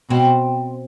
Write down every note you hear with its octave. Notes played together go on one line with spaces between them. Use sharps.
B2 C4